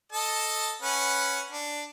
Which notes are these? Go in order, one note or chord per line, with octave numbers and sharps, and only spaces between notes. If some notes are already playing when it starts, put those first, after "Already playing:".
A4 D#5 A5
C#4 B4 F#5
D4